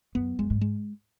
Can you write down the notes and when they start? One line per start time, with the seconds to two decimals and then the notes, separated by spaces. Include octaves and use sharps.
0.15 F#2 B3
0.39 F#2 G#3
0.50 G#2
0.61 G#3